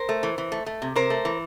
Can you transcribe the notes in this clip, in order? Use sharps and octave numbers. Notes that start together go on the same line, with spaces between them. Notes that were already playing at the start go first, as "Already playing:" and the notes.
Already playing: A#4 C5
A3
E3
E3
A3
A3
C3
C3 A#4 C5
A3
E3